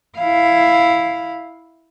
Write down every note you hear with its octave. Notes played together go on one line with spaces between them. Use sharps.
E4 F5